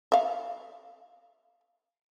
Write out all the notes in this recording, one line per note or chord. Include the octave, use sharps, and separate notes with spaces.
E5 F5